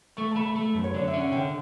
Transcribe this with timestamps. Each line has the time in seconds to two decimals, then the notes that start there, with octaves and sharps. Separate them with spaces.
0.17 A3 C#6
0.31 A5
0.36 A3 B5
0.56 A3
0.75 F#2
0.84 C#5
0.94 D3 D5
1.08 E5
1.14 C#4
1.20 F#5
1.32 D3 G5